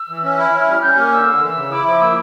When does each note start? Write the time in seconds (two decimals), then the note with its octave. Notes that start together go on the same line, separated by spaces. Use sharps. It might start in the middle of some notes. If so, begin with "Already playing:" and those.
Already playing: E6
0.09 E3
0.24 C#4
0.38 E4
0.53 C#4 F6
0.68 G3
0.82 C#4 G6
0.97 A#3 F6
1.12 D3 E6
1.27 D3
1.41 E3
1.56 C#3
1.71 E4 D6
1.86 F3 D6
2.01 A#3 E6